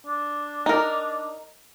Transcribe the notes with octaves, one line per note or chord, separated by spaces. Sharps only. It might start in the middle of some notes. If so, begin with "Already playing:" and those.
D4
D#4 A#4